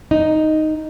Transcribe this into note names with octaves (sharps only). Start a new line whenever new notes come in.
D#4